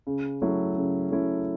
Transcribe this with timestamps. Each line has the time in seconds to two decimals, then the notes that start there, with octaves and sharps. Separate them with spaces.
0.07 C#3
0.42 F#3 A3 C#4 E4
0.76 C#3
1.11 F#3 A3 C#4 E4